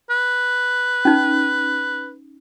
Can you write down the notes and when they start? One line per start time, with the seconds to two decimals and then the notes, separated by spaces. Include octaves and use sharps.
0.10 B4
1.05 C#4 D#4